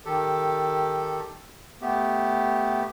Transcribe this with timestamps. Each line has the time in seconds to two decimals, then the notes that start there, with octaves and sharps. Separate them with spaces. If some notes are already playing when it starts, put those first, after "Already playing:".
0.05 D#3 G4 A4
1.81 A3 B3 G4